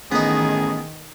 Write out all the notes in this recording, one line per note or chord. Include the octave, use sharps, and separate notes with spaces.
A1 D#3 B3 D#4 G#4